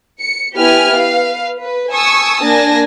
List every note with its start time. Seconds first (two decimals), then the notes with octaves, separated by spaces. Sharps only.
0.22 C#7
0.56 B3 E4 G4 B4 G#5 F6
0.97 B4 F5
1.60 B4
1.90 G#5 A5 C#6 D#6 E6
2.41 A#3 D4 G#5 A5 A#6